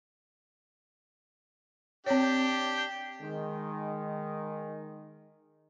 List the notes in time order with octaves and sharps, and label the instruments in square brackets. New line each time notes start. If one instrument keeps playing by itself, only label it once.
[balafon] C4 C#5 [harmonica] D4 G4
[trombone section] D#3 G#3